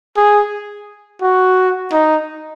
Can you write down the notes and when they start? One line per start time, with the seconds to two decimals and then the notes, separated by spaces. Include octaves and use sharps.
0.17 G#4
1.22 F#4
1.92 D#4